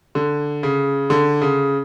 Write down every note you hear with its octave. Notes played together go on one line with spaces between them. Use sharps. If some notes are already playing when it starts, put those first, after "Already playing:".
D3
C#3
D3
C#3